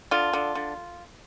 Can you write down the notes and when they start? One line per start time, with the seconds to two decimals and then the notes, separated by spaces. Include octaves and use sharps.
0.11 D3 F4
0.33 D3
0.55 D3